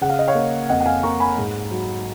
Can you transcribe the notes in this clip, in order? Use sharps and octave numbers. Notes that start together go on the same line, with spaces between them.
C#3 F#5
F5
D#5
C#5 F5
A#3
F2 D#5 F#5
F#5
F5 G#5
A#3 A#5 C#6
G#5 B5
G#2
F#3